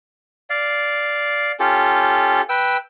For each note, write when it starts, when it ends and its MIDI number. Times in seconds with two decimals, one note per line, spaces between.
0.50 1.52 74
0.50 1.52 77
1.60 2.41 61
1.60 2.41 65
1.60 2.41 67
1.60 2.41 69
2.49 2.77 71
2.49 2.77 79
2.49 2.77 88